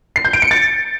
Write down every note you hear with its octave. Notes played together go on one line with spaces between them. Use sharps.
C7
G6
D7
C#7
A6